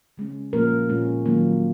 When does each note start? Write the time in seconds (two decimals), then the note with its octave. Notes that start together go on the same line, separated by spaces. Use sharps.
0.17 C#3 G#3 C#4
0.53 A#2 F3 A#3 C#4 A#4
0.89 A#2 G#3 C#4
1.26 D#3 F#3 A#3